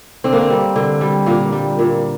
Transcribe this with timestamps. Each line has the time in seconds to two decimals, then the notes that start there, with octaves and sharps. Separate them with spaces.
0.24 D3 C4
0.33 A#3
0.41 C4
0.50 G3
0.76 D3
1.01 G3
1.26 A#2 A#3
1.52 G3
1.79 A#2